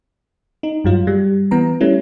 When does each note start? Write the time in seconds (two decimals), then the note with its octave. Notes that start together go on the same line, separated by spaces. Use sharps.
0.63 D#4
0.84 G2 F#3 F4
1.07 G3
1.51 E3 B3 A#5
1.81 G3 A3 C#4 E4